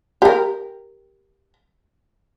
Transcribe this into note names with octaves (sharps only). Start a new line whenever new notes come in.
G4 A#4